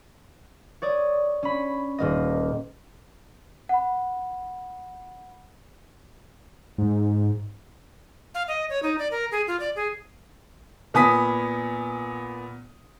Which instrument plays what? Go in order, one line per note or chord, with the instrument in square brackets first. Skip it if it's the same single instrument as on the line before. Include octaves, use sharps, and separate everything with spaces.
[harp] C#5 D5 D#6
C#4 B5
D#1 A#3 D#5
[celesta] F#5 B5
[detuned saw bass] G#2
[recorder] F5
D#5
C#5
D#4
D5
A#4
G#4
F4
D5
G#4
[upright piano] A#2 B3 G#5 D#6 B6